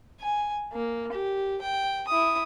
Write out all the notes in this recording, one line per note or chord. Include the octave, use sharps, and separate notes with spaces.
G#5
A#3
G4
G5
E4 D#6